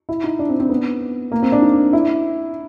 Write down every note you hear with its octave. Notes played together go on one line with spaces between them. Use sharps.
E4
D#4
D4
C4
C4
B3
A#3
C4
D4
D#4
E4